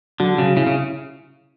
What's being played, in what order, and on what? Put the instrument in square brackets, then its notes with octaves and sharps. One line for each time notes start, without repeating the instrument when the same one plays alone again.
[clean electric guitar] D3 [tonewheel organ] F#3
[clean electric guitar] C#3 [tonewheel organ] F#3
[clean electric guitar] C#3 [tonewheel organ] E4
[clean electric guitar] C#3